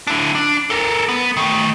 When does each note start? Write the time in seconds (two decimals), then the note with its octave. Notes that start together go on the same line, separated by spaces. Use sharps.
0.07 D4 E4
0.35 D4
0.70 A4 A#4
1.09 B3
1.37 D#3 A3